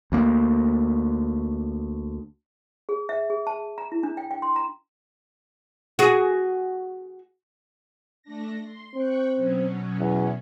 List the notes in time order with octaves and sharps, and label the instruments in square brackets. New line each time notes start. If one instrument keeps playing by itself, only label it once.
[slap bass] D2 A#3
[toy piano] G#4
E5
G#4
A5
A#5
E4
D4
G5
G5
C6
A#5
[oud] F#4 G#4
[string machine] A3 D4 A#6
C6
[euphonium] C4 [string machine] G5 C#6 F#6
[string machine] B2 F#3 C#4
[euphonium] E2